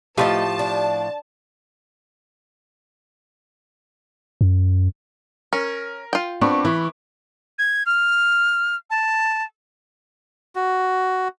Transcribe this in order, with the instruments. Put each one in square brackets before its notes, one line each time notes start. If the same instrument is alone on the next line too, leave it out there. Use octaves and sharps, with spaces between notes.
[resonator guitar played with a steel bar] A2 F3 F4 [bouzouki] A3 B4 D#5 [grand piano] G4 [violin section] A5
[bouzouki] D4
[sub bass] F#2
[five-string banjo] C#4 [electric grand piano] A#4
[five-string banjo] F4 G5
[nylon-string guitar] B3 D4 [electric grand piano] C4 [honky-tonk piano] B5 C#6 D6
[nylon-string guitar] E3 [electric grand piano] E4
[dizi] G#6
F6
A5
[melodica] F#4